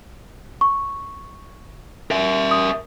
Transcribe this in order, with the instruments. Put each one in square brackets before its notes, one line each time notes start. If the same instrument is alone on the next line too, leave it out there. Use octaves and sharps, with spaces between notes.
[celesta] C#6
[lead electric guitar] A#4 E5
[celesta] D#6